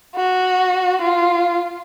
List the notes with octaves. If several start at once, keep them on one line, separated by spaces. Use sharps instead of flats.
F#4
F4